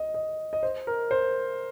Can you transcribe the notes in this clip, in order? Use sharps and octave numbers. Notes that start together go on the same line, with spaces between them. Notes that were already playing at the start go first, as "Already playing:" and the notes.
Already playing: D#5
D#5
D#5
C5
A#4
C5